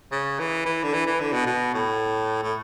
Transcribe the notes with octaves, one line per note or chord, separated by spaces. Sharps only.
C#3
E3
E3
D3
E3
E3
D3
B2
B2
A2
A2